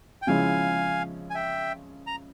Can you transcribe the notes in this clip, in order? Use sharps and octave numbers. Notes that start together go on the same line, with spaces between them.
G5
C#3 F3 G#3 C#4 E4 F5 G#5
G#5
E5 G5
A#5